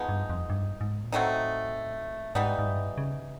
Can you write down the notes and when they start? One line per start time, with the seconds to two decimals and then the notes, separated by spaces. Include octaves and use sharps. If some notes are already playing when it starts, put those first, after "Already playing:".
Already playing: F3 G#3 B3 D#4
0.09 G2
0.30 F2
0.50 G2
0.81 G#2
1.04 A#2
1.12 A2 F#3 A3 C4 D#4
2.35 G#2 E3 G3 B3 D#4
2.59 G#2
2.67 G2
2.98 C#3